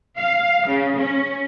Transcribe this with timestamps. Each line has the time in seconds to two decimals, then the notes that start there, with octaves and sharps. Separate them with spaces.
0.18 F5
0.68 C#3
0.97 C#4